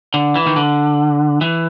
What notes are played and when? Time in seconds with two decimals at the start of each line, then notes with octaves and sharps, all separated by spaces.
0.14 D3
0.36 E3
0.47 D#3
0.56 D3
1.41 E3